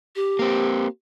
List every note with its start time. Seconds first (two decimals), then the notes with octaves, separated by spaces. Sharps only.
0.16 G4
0.39 A#3 C4